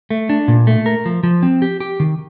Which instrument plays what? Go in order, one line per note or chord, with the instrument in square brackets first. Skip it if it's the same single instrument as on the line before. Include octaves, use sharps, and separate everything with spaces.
[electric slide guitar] A3
D4
A#2
A3
A#4
F3
F3
C4
G4
G4
D#3